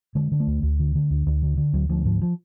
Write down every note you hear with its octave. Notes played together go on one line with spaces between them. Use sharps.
D3 G#3
D3
A3
D2
D2
D3
D3
D2
D2
D3
D3
D2 F#3
D2 F3
G#2 F3
F3